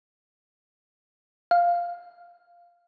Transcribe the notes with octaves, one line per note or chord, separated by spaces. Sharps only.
F5